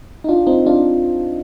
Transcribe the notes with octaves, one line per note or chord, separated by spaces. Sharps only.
D#4
D4 F4
C4 D#4
D4 F4